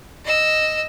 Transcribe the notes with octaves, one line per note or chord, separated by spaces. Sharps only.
D#5 E6